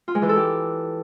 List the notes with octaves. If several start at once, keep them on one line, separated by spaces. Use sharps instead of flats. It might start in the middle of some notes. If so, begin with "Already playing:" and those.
F4
G#3
E3
A4
G4